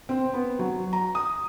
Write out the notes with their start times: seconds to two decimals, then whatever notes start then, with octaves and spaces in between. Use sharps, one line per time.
0.09 C4
0.34 B3
0.59 F#3
0.93 A#5
1.15 D#6